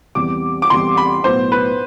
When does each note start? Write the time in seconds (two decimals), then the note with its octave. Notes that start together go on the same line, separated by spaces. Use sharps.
0.15 E2 C3 G3 D6
0.62 D6
0.70 E2 C3 G3 C6
0.97 B5
1.24 B1 A2 F#3 B3 C5
1.52 B4